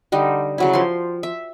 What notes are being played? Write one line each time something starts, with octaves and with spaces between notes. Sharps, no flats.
D3 G3 D#4
C#3 F#3 E4
F3 C6
E5